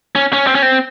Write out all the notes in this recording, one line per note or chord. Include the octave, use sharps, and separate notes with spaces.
C#4
C#4
C4
C#4
C4